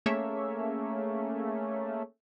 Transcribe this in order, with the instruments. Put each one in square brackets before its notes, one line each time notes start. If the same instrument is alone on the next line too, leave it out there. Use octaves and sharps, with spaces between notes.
[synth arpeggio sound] A3 A#3 C#4 G#4 C#5 E5